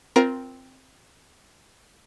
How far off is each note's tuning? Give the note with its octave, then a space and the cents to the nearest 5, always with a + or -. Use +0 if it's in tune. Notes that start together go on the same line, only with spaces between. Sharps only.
C4 +0 F4 +0 A#4 +15